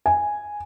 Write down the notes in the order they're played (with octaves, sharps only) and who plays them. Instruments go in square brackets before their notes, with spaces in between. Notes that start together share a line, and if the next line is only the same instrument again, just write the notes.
[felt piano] G#5